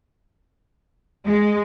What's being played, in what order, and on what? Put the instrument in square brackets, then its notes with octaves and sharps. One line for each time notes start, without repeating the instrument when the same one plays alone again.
[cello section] G#3